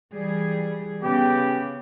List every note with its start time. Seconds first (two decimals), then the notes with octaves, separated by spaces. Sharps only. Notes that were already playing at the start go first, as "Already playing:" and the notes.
0.13 E3 G3 G#4
1.03 C#3 B3 G4